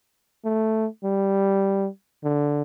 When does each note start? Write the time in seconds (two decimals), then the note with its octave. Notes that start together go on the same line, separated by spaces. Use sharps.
0.45 A3
1.04 G3
2.24 D3